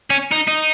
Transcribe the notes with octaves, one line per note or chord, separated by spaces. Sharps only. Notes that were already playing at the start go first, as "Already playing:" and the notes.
C#4
D#4
D#4